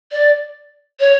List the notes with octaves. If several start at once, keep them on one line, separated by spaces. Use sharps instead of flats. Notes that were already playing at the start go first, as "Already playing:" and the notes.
D5
C#5